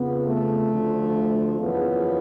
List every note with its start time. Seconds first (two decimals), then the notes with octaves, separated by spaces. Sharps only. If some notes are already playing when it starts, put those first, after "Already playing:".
Already playing: F2 C#3 F3 B3
0.27 A3
0.71 D2 D3 F3
1.60 F#1 E2 C#3 F3 B3